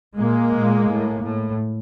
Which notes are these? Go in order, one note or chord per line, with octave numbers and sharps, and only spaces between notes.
A#2 G#3 A#3
A#2
A2
A2